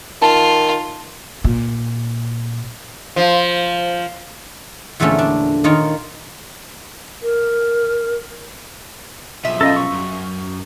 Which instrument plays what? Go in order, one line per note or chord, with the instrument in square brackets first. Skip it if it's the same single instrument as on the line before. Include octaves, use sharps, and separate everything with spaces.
[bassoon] D#3 [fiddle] F4 [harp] A5
[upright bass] A#2
[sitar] F3
[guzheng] E2 A#2 D3 F3 A3 C#4
D4
D#3 A#3 D#4 F4 C#5
[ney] A#4
[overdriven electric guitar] B1 F3 [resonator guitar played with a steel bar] E5
[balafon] C#4 F5 [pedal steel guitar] A4 D#5
[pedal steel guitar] C#6
[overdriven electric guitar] F#2